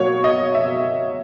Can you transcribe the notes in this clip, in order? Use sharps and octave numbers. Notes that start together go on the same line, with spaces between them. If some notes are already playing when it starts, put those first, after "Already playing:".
Already playing: B2 F#3 A#3 C#5
D#5
E5